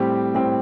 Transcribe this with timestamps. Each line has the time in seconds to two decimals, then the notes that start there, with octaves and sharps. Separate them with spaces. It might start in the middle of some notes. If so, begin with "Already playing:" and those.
Already playing: A2 G3 C4 G4
0.35 A2 G3 C4 G4